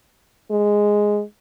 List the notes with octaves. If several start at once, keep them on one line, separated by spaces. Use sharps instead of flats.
G#3